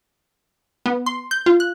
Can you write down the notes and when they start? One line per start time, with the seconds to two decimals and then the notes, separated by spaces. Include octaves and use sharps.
0.86 B3
1.06 C6
1.31 G6
1.46 F4
1.60 F#6